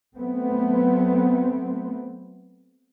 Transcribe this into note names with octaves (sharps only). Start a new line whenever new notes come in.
F#3 A3 B3 C4